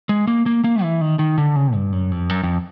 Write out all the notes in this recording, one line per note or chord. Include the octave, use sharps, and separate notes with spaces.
G#3
A#3
A#3
A#3
E3
D#3
D#3
D3
C#3
G2
F#2
F2
F#2
F2